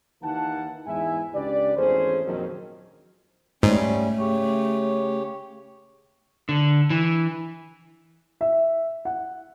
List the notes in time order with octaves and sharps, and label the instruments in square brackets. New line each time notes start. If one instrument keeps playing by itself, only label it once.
[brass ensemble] D#2 D#3 E3 A#3 F#5 A5
E2 G#2 G#3 E4 E5 G#5
C#2 D4 G4 B4 D5
G#1 E2 A3 C#4 G#4 C5
A#1 F2 D#3 F#3
[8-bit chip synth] G#2 [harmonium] G3 C#4 [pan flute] A3
[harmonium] C#3 G4 C#5
[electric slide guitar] D3
E3
[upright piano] E5
F#5